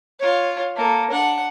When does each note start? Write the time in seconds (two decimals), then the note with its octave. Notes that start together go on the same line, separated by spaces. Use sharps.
0.19 F4 C#5
0.76 A#3 A4
1.11 D4 F#5